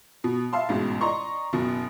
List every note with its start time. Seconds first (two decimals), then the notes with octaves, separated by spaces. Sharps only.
0.24 B2
0.53 E5 F5 A5 C6
0.69 A1 G#2 B2
1.01 D5 D#5 A#5 C6 C#6
1.53 F#1 B2